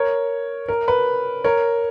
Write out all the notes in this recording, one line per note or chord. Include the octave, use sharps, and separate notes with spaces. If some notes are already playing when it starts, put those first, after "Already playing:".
Already playing: A#4 C#5
A#4
B4
A#4 C#5